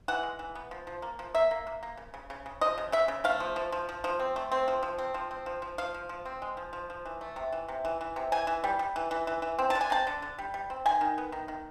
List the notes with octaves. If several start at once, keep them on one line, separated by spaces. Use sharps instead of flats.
E3 F#5
G#3
E3
B3
F3
F3
A#3
F3
A#3 E5
A#3
A#3
A#3
C#3
C#3
C#3
C#3
F3 D#5
C#3
C#3 E5
C#3
A3 F5
F3
F3
F3
F3
F3
C4
A3
C4
F3
F3
C4
F3
C4
F3
F3
F3 F5
F3
F3
C4
G#3
F3
F3
F3
E3
A3
C3
E3
C3
E3
E3
C3
E3 G#5
E3
G3
G3
E3
E3
E3
E3
C4
D3 A5
G#5
C4 A5
D3
D3
G3
G3
C4
D#3 G#5
D#3
B3
D#3
D#3